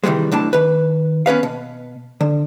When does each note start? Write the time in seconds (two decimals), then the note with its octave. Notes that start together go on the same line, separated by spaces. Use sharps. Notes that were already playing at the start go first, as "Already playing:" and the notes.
0.04 C3 D#3 E3 G3 G#3
0.31 B1 A2 D4 A5
0.53 D#3 B4
1.26 B3 C#4 B4 F5
1.43 B2
2.21 D3